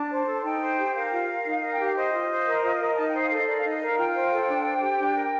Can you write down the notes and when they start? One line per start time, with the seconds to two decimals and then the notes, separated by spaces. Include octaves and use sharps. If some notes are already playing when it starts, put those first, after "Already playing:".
Already playing: D4 A5
0.11 C5
0.27 A4
0.43 D#4 G5
0.62 C5
0.77 G4
0.95 A#4 F5
1.12 F4
1.28 A#4
1.45 D#4
1.62 A#4
1.72 G5
1.79 G4
1.85 F5
1.95 C5 D#5
2.13 F4
2.29 C5
2.47 A#4
2.63 F4
2.80 A#4
2.96 D#4 A5
3.09 G5
3.14 C5
3.22 F5
3.31 A4 D#5
3.47 A#4 D5
3.58 F5
3.65 D#4 D#5
3.81 A#4 F5
3.97 F4 G5
4.15 C5
4.32 A4
4.49 D4
4.65 C5
4.82 G4
4.99 D4
5.16 A#4